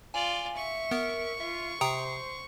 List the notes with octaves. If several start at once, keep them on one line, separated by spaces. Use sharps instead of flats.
F4 D5 G#5
E5 C#6
B3 A#4
F4 E5
C3 C5 G5 A#5 D#6